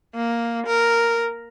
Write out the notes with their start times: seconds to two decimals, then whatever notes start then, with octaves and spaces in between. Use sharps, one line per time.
0.15 A#3
0.66 A#4